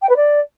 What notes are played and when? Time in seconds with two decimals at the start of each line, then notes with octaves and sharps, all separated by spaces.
0.02 G5
0.09 B4
0.16 D5